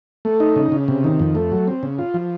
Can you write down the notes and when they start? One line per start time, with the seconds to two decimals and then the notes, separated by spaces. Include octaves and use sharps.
0.25 A3
0.40 D#4
0.56 C#3
0.72 C#3
0.88 C3
1.04 D#3
1.20 F2
1.35 A3
1.52 F#3
1.68 C4
1.83 C#3
1.99 F4
2.14 F3